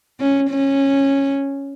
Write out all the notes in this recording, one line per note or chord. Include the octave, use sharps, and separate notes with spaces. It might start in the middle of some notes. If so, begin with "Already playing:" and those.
C#4
C#4